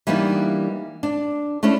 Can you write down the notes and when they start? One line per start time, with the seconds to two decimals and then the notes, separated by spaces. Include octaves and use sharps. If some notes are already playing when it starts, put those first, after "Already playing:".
0.07 E3 G3 A#3 B3 D4 D#4
1.03 D4
1.63 A3 C#4 D4 E4